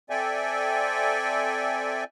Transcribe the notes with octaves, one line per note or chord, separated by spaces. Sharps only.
C4 A4 D5 E5 G5 G#5